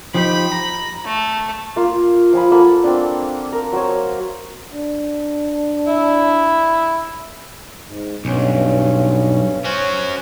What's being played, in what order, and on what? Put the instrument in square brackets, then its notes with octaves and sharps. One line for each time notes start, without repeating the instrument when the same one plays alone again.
[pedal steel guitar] F3 D#4 G4 [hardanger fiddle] B5
[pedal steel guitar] A#5
[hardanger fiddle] A3
[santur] A#3 F4
F3 G#5 B5
A#3 A4 F#5 B5
C4 D4
A#4
F#3 C5 C#5
[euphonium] D4
[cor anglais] E4
[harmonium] G#2
[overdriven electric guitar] B1 [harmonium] G2 C#4
[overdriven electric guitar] C#4 F#4 [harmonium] C5 C#5